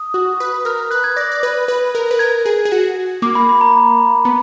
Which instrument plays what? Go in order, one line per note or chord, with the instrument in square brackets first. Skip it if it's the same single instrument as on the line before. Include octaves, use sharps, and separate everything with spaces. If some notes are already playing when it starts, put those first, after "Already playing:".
Already playing: [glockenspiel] D#6
[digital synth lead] F#4
B4
[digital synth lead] A#4 [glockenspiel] F6
[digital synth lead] B4 [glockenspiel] F#6
[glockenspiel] G#6
[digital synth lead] D5 [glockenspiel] A#6
[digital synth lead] D5
B4
B4
A#4
B4
[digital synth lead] A#4 [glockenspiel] G#6
[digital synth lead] G#4
G#4
F#4
[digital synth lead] A#3 [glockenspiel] D6
[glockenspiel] B5
B5
A#5
[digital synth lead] B3